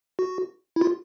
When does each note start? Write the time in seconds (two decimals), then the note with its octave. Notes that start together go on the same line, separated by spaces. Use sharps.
0.19 F#4
0.76 E4
0.81 F4